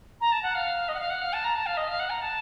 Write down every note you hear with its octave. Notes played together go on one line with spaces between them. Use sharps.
A#5
A5
F#5
F5
D#5
F#5
F5
F#5
F5
A5
A#5
A5
F5
D#5
F5
F#5
A#5
A5